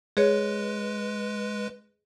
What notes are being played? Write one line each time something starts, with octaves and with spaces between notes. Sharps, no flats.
G#3 G#4 B4 C#5